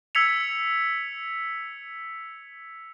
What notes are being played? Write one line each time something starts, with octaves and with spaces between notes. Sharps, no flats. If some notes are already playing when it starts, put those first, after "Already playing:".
E6 G#6 B6 C#7 F7